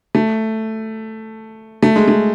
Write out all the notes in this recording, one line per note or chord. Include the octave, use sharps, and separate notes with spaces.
A3
A3
G#3
A3